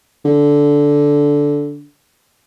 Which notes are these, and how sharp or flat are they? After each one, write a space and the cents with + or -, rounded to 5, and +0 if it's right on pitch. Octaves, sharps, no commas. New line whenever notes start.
D3 -10